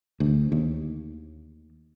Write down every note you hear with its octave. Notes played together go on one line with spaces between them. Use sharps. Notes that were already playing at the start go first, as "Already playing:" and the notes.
D2
D#2